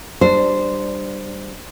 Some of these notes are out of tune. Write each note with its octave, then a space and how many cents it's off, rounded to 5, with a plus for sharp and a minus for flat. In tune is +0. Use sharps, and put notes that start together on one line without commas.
G3 +0 D4 +15 C5 -10